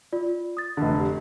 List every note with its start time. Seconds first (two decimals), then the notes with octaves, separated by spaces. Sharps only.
0.13 F4 D5
0.57 D#6 A6
0.77 F1 D3
1.00 G4